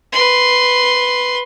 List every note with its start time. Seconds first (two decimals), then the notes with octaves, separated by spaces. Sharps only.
0.13 B4 C6